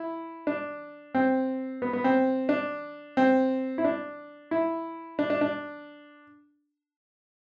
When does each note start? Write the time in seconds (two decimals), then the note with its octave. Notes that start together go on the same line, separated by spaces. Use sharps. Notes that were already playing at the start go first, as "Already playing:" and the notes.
Already playing: E4
0.47 D4
1.15 C4
1.82 B3
1.93 B3
2.04 C4
2.49 D4
3.17 C4
3.78 E4
3.84 D4
4.51 E4
5.19 D4
5.30 D4
5.41 D4